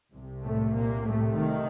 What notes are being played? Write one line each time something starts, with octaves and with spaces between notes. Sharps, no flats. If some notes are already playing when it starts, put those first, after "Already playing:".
C2 C3
A2 A3
A#2 A#3
A2 A3
D#3